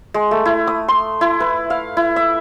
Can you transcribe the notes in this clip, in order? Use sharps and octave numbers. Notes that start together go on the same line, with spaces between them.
G#3
A3
E4
D#6
C6
E4
B4
F5
E4
E5